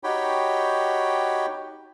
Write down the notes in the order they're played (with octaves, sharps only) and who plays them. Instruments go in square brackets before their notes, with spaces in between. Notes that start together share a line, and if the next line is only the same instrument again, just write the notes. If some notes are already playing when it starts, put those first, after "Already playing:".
[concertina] D#4 F#4 G4 C#5 G5 B5